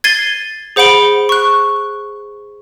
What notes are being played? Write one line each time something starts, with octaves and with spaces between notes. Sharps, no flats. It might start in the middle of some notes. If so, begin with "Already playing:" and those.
G#6 A6 C7 D#7 G7
G#4 C5 F#5 B5 D7 G7
C#6 F#6